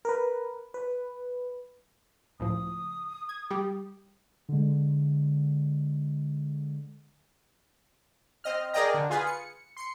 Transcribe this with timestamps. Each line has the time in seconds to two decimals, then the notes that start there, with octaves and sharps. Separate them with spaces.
0.05 A#4 B4
0.74 B4
2.40 C#2 A2 F3 D#6
3.29 G#6
3.51 G3 G4
4.49 D3 G#3
8.44 C4 D#5 F6
8.73 G#4 A#4 D5 D#5 G5 A#5
8.94 D3
9.10 F4 G#4 B4
9.26 C#7
9.77 C6 C#7